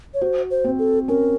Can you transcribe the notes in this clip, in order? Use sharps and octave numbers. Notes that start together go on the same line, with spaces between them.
C#5
F#4 C5
C5
C4
A4
C#4 A#4